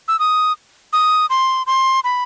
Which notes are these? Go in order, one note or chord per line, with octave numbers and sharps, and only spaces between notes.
E6
D#6
D#6
C6
C6
B5